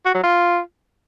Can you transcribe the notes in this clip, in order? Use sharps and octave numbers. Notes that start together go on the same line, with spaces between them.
F#4
F#3
F4